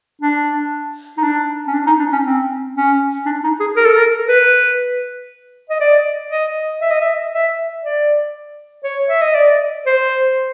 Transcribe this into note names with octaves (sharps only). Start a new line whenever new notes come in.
D4
D#4
D4
C#4
D4
D#4
D4
C#4
C4
C#4
D4
D#4
G#4
A#4
A4
A#4
B4
D#5
D5
D#5
E5
D#5
E5
E5
D5
C#5
E5
D#5
D5
C5